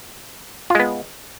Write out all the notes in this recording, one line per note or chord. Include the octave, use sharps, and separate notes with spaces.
G#3 B3 F4